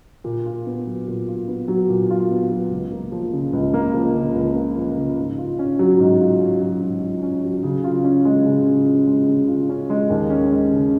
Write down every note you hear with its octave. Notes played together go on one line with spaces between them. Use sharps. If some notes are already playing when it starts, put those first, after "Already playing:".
A#2
F4
B3
F#3
A#2
F4
B3
F#3
A#2
F4
B3
F#3
C#2
A#3
F3
C#3
C#2
A#3
F3
C#3
C#2
A#3
F3
C#3
G#2
F4
C#4
F#3
G#2
F4
C#4
F#3
G#2
F4
C#4
F#3
C#3
F4
C#4
G#3
C#3
F4
C#4
G#3
C#3
F4
C#4
G#3
D#2
C#4
G#3
C#3